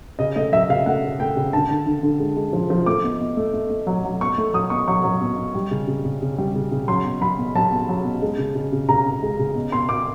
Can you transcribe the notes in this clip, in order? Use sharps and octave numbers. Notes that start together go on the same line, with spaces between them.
C#3 D#5
A3 D#5
F#3 E5
C#3 F5
A3 F#5
C#3
A3 G5
C#3
D3 A5
D3
D3
D3
G#3
G#3
F3
F3
A3 D6
B2
B2
A3
A3
A3
F#3
F#3
B2 C#6
A3
F#3 D#6
B2 C#6
F#3 C#6
F#3
B2
B2
G3
C#3
C#3
C#3
C#3
G3
C#3
C#3
F#3 C6
B2
F#3 B5
B2
F#3 A5
B2
F#3
B2
G#3
C#3
C#3
C#3
C#3 A#5
C#3
G#3
C#3
B2
B2 C6
B2 D6